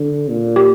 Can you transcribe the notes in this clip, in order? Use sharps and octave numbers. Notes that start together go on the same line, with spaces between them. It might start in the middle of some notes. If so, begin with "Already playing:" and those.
Already playing: D3
A#2
G4